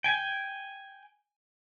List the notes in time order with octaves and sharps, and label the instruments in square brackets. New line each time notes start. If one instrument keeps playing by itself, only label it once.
[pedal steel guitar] G5 G#5